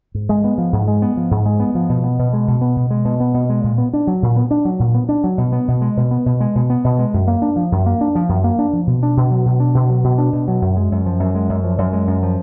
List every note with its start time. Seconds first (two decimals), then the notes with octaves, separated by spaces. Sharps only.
0.14 G#2
0.29 G#3
0.44 B3
0.58 F3
0.73 G#2
0.88 G#3
1.02 B3
1.17 F3
1.31 G#2
1.46 G#3
1.60 B3
1.75 F3
1.89 B2
2.04 B3
2.19 B2
2.33 G#3
2.48 B2
2.61 B3
2.76 B2
2.90 G#3
3.05 B2
3.20 B3
3.34 B2
3.50 G#3
3.64 A#2
3.78 B3
3.93 D4
4.07 F#3
4.22 A#2
4.36 B3
4.51 D4
4.65 F#3
4.80 A#2
4.94 B3
5.09 D4
5.24 F#3
5.38 B2
5.52 B3
5.68 B2
5.82 G#3
5.97 B2
6.11 B3
6.26 B2
6.41 G#3
6.55 B2
6.70 B3
6.84 B2
6.99 G#3
7.14 F#2
7.28 A#3
7.42 D4
7.56 F3
7.72 F#2
7.86 A#3
8.01 D4
8.15 F3
8.29 F#2
8.44 A#3
8.59 D4
8.73 F3
8.87 B2
9.03 D4
9.17 B2
9.31 F#3
9.46 B2
9.60 D4
9.75 B2
9.89 F#3
10.04 B2
10.18 D4
10.33 B2
10.48 F#3
10.62 F#2
10.76 G#3
10.92 F#2
11.06 F3
11.20 F#2
11.35 G#3
11.49 F#2
11.64 F3
11.78 F#2
11.93 G#3
12.07 F#2
12.23 F3